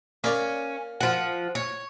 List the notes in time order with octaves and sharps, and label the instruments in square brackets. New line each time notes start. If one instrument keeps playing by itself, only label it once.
[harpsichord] A#3 D5 [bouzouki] C#4
[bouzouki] F3 F#5
C#5